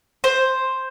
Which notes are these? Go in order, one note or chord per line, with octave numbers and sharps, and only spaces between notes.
C5